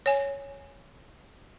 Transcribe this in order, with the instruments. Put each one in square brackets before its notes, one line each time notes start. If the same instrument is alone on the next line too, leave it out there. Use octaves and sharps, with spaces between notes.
[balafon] C#5 G#5